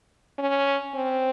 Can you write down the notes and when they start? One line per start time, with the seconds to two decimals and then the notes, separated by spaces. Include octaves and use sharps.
0.39 C#4
0.95 C4